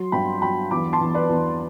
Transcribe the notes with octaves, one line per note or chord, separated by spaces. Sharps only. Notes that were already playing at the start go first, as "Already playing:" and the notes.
Already playing: F#3 C6
G2 G5 B5
F#3 G5 B5
E2 B5 D6
A5 C6
E2
B4 D5
E2